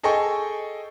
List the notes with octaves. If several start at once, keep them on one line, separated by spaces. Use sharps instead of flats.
G#4 A4 D#5 G5 G#5 C#6